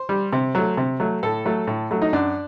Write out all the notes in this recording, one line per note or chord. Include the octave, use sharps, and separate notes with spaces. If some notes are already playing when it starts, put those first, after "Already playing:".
Already playing: C5
G3
C3
F#3 A3
C3
F#3 A3
A2 A4
F#3 A3
A2
F#3 A3
D#4
F#2 D4